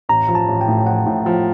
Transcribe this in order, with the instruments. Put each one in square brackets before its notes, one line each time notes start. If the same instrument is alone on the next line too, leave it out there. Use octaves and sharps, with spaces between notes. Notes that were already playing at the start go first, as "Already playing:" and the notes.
[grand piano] A1 [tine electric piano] A#5
[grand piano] F3
[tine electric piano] A5
[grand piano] A1
[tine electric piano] G5
[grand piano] A2
[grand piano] F3 [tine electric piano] F#5
[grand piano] A2
F3